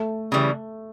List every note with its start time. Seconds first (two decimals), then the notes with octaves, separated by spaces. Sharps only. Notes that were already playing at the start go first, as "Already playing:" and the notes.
Already playing: A3
0.32 C#3 E3 G3